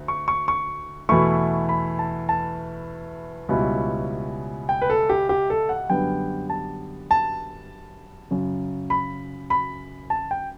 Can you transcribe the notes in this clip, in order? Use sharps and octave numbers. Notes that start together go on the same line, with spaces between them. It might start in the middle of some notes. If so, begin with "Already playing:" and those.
Already playing: D2
C#6
C#6
C#6
E2 B2 A3 E4 C#6
B5
A5
A5
C#2 B2 G3 B3 E4
G5
B4
A4
G4
G4
A4
F#5
F#2 D3 G3 B3 G5
A5
A5
F#2 C#3 F#3
B5
B5
A5
G5